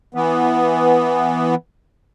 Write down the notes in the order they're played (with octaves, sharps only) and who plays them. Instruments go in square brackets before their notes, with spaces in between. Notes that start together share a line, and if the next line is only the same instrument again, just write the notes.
[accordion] E3 B3